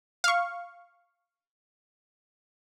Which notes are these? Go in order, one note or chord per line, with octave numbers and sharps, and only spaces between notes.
F5 C#6